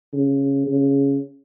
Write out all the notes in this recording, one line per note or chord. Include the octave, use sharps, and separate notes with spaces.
C#3
C#3